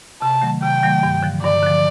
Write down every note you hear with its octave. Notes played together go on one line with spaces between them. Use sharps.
C3 A5
D#3 F#3 A3
C3 G5
D#3 F#3 A3
G2
D3 F3
G2 D5
D3 F3